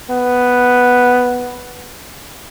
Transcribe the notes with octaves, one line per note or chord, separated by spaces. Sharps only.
B3